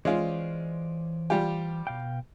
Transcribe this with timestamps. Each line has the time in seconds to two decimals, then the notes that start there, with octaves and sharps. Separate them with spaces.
0.05 E3 G#3 C#4 F4 C5 D5
1.30 G3 F4 G4
1.87 B2 F5 G5